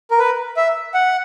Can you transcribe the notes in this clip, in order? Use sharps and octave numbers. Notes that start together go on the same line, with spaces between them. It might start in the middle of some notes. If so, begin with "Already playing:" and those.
A#4
B4
E5
F#5